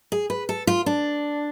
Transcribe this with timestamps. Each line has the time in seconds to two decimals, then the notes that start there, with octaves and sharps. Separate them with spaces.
0.12 G#4
0.30 B4
0.49 A4
0.67 F4
0.86 D4